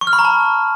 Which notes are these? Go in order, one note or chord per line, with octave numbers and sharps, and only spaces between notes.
C#6
F6
B5
A#5
A5